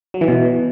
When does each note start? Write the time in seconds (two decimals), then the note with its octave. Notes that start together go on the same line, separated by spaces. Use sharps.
0.14 F#3
0.21 E3
0.28 B2